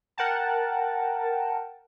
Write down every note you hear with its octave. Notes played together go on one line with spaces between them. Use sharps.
A#4 F#5 G5 A5